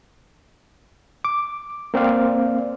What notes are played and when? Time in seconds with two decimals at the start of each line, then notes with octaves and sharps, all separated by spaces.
1.25 D6
1.94 A#3 C4 D5 F5